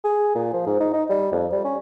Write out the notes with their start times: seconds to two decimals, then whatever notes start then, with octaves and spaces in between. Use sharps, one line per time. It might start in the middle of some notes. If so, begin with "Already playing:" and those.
0.05 G#4
0.35 A#2
0.53 F3
0.66 G#2
0.80 D#4
0.94 D#4
1.10 G3
1.32 F2
1.52 G3
1.65 C#4